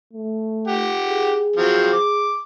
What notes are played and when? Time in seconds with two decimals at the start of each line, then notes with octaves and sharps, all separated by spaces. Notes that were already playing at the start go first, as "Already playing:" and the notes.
0.13 A3
0.67 G4 F#5
1.06 G#4
1.56 F3 F#3 C4
1.93 D6